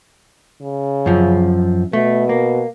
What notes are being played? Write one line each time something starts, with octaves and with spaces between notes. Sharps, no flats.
C#3
F#2 F3
B2 A3
A#3